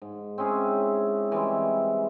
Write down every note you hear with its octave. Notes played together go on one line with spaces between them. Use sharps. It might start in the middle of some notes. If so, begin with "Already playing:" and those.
G#2
C4 C#4 E4 G#4
E3 G3 G#3 C4